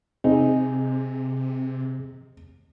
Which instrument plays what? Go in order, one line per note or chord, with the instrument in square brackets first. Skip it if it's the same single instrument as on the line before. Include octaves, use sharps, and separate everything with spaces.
[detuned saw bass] C3 [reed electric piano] C4 G#4 [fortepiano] D#4